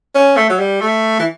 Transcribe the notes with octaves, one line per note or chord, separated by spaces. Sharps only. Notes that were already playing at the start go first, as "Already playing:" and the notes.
C#4
A3
F#3
G3
A3
E3